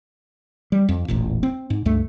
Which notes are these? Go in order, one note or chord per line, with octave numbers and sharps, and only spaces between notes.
G3
F2
E1 A1 A#2
C4
G#2
C#2 G2 A3